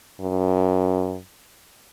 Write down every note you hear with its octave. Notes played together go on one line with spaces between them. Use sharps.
F#2